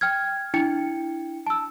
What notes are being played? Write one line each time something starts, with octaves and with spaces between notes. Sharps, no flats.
G5 F6 G#6
D4 E4 G5 C#7
A5 E6